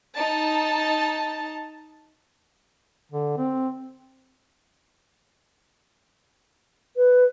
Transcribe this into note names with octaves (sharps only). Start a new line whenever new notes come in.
D#4 A5
D3
C4
B4